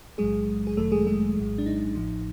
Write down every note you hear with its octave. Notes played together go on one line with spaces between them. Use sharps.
B1 A2 F#3 G#3 G#4
G#4
G1 F#2 D#3 F#3 A3 A4
G#3 G#4
G#3 G#4
A#1 A2 F#3
D4
D#4
A1 A2 F3